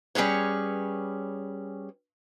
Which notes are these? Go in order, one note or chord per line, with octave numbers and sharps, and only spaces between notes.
G3 C#4 G#4 B4 C#5